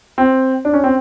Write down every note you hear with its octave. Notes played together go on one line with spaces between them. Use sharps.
C4
D4
C#4
C4